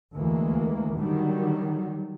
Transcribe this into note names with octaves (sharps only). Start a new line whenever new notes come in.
D2 E3 G#3 A#3
D3 D#3 F#3 G3